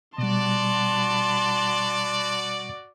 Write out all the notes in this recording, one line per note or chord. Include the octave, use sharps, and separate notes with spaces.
B2 G3 F#4 D5 A5 C6